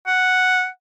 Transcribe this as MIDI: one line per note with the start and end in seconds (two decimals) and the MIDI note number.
0.07 0.67 78